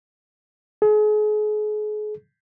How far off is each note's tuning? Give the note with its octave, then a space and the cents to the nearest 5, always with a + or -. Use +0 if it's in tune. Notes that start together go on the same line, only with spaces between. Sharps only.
G#4 +35